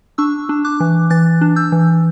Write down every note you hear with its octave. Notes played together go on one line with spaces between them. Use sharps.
D4 C#6 E6
D4
D6 F#6
E3
E3 F#6 A6
D4
E6 G6
E3